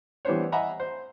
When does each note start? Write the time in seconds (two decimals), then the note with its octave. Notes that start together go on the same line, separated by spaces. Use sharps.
0.25 E3 G3 B3 D4 C5 C#5
0.52 D#5 E5 F#5 G#5 A#5 B5
0.80 C5